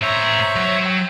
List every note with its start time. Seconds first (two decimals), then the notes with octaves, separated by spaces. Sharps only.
0.02 A2 C5 C#5 E5 A#5
0.56 F#3
0.85 F#5 G5